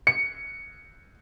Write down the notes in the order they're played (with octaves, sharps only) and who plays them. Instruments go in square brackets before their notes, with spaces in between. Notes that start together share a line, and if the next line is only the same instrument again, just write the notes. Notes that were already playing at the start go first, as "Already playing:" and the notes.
[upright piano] C#7